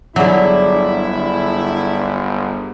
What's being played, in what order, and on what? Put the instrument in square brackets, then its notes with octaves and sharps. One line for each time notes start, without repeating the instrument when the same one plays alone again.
[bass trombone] G1 [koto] D3 F#3 [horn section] E4 [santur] G#4 D5 E5